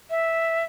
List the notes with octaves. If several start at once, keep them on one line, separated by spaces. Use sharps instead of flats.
E5